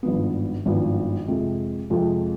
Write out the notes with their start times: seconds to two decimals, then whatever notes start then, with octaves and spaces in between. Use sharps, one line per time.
0.03 G#1 G2 F3 B3
0.66 G#1 G2 F3 B3
1.28 F2 C3 F3 G#3
1.90 F2 C3 F3 G#3